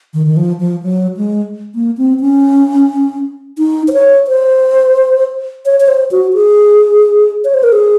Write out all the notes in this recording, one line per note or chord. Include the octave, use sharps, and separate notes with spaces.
D#3
D#3
F3
F3
F#3
G#3
A#3
C4
C#4
D#4
C5
C#5
C5
C#5
C#5
C5
F#4
G#4
C#5
C5
A#4
G#4